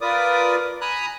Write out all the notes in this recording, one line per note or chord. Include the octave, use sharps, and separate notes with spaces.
F4 A#4 B4 D5 D6 D#6
G#5 A#5 B5 D#6 F#6